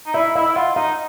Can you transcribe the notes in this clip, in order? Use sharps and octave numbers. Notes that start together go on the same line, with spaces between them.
D#4
E4 D5 E5
E5
E4 D#5 F5
E4
F4 E5 F#5
D#4 D#5 F5